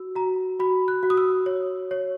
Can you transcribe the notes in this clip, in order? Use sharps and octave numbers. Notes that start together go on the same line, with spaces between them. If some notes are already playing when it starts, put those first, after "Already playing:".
Already playing: F#4 E6
F#4 A#5
F#4 B5
F#6
F#4
D#6
E6
C#5
C#5